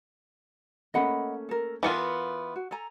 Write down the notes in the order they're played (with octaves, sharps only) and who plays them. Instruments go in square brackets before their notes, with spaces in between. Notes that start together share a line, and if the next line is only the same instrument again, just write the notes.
[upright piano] A3 A#3 C#4 [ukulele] D#5 F#5 B5
[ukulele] A4 A#4
[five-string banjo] E3 B3 F4 [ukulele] A4 A#4 [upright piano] F#5 C#7 D#7
[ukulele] F#4
A4 G#5 A#5